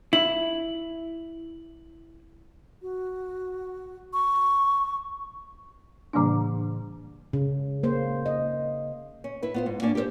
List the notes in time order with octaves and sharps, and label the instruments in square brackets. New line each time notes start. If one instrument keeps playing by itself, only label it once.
[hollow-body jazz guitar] E4 [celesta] F#7
[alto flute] F#4
C#6
[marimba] A2 C#3 E3 G3 A#3 D4
[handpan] C#3
A#3 C5
D#5
[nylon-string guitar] C#4
E4 B4
B3 F4 C5
G#2
A#3 C#4 D4
G4 A#4 C5